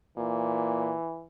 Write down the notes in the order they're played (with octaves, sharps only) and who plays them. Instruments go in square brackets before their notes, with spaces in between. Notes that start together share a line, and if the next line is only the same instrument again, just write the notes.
[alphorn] A#2 [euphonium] E3